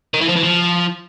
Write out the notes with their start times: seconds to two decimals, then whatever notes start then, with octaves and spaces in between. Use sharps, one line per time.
0.14 D#3
0.21 E3
0.28 F3
0.36 E3
0.43 F3